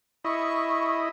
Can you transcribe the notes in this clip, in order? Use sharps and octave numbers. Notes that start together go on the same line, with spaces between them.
E4 D#5 C#6